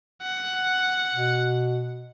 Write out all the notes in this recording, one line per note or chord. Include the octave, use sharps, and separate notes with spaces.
F#5
B2